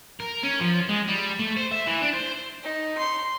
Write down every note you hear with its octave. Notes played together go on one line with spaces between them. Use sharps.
A#4
C#4
F3
G#3
G3
A3
C5
E5
E3
D4
C5
D#4
C6